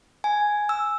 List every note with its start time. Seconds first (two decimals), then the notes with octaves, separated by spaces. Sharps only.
0.24 G#5
0.69 E6